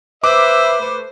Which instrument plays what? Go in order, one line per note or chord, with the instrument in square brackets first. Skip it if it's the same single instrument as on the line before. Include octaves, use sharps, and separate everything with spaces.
[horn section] B4 [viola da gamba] C5 [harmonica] E5 [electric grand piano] D6
[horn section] A3 B4